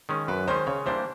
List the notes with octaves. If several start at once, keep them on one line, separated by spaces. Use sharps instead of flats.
D#3 G#3 C#4
F#2 B4
D#3 G#3 C#4 C5
C#3 C#5
E3 G3 A#3 D4 C5